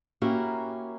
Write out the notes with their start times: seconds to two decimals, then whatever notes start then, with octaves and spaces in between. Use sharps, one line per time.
0.22 A#3 C#4 E4 F#4 G4 A#4